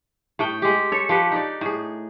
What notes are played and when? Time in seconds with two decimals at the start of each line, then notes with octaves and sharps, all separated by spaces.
0.39 A2 A3 G5
0.62 G#3 G4
0.92 A4 C#5
1.09 F3 G4 B4
1.32 D#4 D5
1.61 A2 G#4